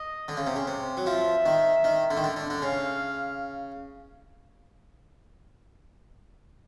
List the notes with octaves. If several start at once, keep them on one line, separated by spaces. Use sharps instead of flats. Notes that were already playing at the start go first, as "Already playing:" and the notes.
Already playing: D#5
D3
C#3
C3
C#3
C3
F#3
F3 E5
D#3
D#3
D3
D#3
D3
D3
D3
C#3 F5